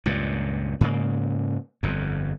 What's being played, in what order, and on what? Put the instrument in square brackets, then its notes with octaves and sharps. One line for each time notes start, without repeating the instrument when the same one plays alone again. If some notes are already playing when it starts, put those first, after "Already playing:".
[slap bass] C#2 G2 A#2
G#2 C#3 A#3
G1 F2